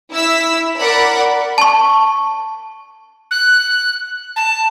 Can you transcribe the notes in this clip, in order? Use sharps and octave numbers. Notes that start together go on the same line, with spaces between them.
E4 E6 B6
A#4 D5 F#5 B5
A5 C#6
F#6
A5